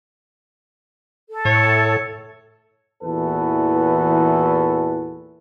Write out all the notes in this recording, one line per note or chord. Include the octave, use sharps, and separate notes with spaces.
A4
A2 C#5
E2 A#2 E3 F#4 A4 B4